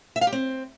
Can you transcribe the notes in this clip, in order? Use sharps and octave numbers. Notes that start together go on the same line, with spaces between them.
E5
F5
G4
C4